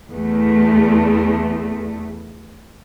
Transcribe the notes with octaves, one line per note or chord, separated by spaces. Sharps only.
E2 A3